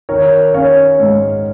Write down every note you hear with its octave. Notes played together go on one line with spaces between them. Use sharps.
D#3 A#4 C#5
C#4 C#5 F5
G#2